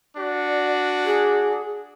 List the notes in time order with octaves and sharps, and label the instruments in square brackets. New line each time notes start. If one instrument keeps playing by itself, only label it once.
[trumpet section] D4 F#4 [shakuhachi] D5
[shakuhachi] G#4